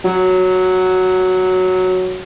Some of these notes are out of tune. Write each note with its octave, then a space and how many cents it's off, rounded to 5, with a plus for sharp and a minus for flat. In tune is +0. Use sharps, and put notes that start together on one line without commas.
F#3 +0